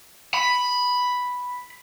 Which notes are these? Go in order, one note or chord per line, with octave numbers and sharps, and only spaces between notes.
B5